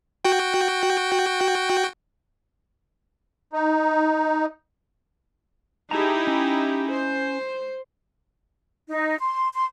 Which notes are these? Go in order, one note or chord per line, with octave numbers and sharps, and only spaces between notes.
F#4 G5
D#4
D#4 E4 G4 G#4 A5 A#5
C#4
C5
D#4
C6
C6